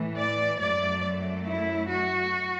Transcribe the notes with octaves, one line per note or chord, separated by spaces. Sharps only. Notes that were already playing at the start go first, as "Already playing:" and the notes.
Already playing: A2 E3 A3
D5
F#2 F#3 A3 D5
E4
F#4